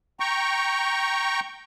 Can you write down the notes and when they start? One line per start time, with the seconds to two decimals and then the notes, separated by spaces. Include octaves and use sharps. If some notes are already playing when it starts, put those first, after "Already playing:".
0.20 G5 A#5 C#6